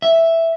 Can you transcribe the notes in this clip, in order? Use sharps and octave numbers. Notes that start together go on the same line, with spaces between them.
E5